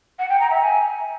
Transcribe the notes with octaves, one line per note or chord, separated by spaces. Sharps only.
F#5
G5
A#5
E5
G#5